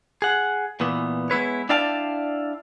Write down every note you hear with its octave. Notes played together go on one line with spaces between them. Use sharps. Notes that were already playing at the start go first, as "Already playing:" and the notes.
G#4 F#5
A#2 E3 B3
G#3 B3 E4 B4 C#5
D4 E4 D5 F5 G5 A5